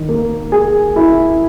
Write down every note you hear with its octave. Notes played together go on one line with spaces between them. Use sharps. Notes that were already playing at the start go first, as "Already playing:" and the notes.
Already playing: D#3
A#3
G#4
E4